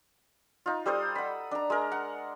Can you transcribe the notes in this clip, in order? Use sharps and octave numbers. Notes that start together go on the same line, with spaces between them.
D#4 F4
G3 A4 C5 D#6
F#5 B5
D4 A#5
G#3 A#4
F#5